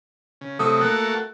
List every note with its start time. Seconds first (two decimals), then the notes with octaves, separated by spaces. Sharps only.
0.41 C#3
0.59 C3 F#3 A3 D#6
0.81 A#3 F#4 A4 F#6